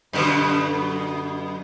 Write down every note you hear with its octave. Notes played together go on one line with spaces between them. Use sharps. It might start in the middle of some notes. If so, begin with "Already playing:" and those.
F#2 B2 D3